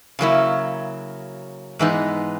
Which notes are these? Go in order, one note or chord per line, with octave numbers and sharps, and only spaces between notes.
C#3 F#3 A#3 E4
G#2 E3 G#3 B3 D#4